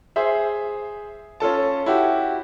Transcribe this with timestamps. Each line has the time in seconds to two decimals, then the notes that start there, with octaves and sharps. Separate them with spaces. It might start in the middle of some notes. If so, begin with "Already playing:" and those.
0.16 G#4 C5 E5
1.40 C#4 F4 A4 A5
1.86 E4 F#4 G4